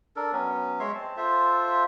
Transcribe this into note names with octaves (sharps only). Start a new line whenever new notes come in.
D4 A4 A#4
F#3 B3 C#4
G#3 C#5 E5 C6
C4 A5
F4 A4 C5 E5